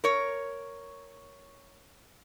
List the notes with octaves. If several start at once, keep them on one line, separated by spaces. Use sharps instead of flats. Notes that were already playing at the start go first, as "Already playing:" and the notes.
A#4 C#5